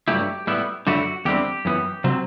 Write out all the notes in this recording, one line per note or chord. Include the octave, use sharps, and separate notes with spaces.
G2 F#3 A3 E4 G4
A2 G3 B3 E4
F#2 D3 A3 E4 F#4
E2 D3 G3 C4 G4
F#2 E3 B3
C3 F#3 C4